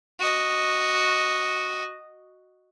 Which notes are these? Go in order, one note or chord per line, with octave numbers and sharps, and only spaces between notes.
F#4 D#5